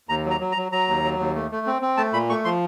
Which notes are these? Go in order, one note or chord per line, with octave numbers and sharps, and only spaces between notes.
D#2 A#5
F#3
A#5
F#3
A#5
F#3
F#3 A#5
D#2
F#3
D#2
A3
A3
C4
C4
A3 A5
A#2 B5
A3 C#6
F3 C6